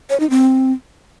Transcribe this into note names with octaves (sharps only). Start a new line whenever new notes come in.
C#5
D#4
C4